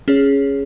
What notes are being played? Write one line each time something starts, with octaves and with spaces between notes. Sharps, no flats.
C#4 G#4 C#5